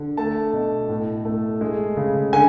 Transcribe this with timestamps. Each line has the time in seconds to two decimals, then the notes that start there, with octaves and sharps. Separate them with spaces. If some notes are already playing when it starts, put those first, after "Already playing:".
Already playing: D3
0.17 A3 A5
0.53 B2
0.89 A2
1.25 A3
1.61 G#3
1.97 C#3
2.33 D3 G#5